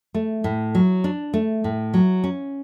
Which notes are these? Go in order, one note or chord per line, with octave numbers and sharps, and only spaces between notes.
A3
A2
F#3
D4
A3
A2
F#3
C#4